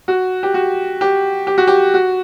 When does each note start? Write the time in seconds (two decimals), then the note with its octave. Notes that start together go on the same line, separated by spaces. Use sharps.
0.08 F#4
0.43 G4
0.54 F#4
1.01 G4
1.47 G4
1.58 F#4
1.67 G4
1.94 F#4